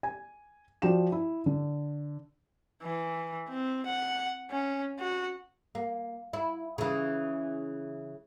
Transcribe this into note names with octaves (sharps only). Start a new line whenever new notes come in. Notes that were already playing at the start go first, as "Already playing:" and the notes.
G#5
F3 F#4 D5 G5 E7
E4
D3
E3
C4
F#5
C#4
F#4
A#3
E4
C#3 E3